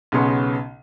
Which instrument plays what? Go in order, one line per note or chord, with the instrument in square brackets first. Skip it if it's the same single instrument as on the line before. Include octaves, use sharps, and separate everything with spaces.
[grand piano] B1 C#3 B3 C#4 C6